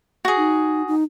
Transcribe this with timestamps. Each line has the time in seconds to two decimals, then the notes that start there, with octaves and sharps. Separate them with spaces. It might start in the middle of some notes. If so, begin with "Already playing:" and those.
0.25 F#4 G#4
0.37 D#4
0.88 D#4